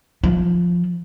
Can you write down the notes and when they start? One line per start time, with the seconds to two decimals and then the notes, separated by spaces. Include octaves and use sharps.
0.24 F3